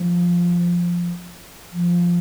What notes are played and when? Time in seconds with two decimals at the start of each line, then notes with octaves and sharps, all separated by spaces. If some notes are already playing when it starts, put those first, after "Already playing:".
Already playing: F3
1.72 F3